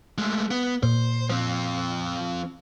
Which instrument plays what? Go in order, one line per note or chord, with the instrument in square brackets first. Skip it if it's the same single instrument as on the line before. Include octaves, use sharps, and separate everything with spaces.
[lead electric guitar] G#3 A3
B3
[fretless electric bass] A#2 [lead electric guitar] C5
[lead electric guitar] F3 C4